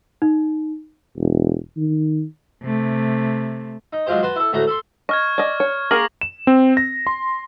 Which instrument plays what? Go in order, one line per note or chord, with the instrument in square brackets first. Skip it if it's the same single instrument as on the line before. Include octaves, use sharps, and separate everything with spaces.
[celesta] D#4
[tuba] E1
D#3
[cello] C3 A3
[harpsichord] D#4
F#3 G#3 F4 G4 C5
F#4 B4 A5 C6
E4 A4
D2 A2 A3 F#4 A#5
A4 B5 C6
[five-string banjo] D#5 [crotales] C#6 F6 G#6
[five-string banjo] D5 D#5
C#5
[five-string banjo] A#3 G#4 A#4 [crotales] D6 A#6 F#7
[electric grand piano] E7
C4
A#6
C6